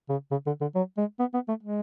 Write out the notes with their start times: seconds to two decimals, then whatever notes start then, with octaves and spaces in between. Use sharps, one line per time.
0.09 C#3
0.31 C#3
0.46 D3
0.61 D3
0.75 F#3
0.98 G#3
1.19 B3
1.34 B3
1.49 A3
1.63 G#3